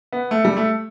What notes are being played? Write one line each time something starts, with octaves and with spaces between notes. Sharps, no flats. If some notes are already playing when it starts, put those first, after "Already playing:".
B3
A3
G3
A3